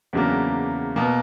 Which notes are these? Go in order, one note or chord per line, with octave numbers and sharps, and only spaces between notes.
E2 C#3 F#3 A#3 D4
B2 A#3